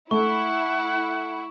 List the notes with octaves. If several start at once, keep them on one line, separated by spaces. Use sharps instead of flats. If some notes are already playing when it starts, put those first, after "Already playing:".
A3 E4 F#5 C#6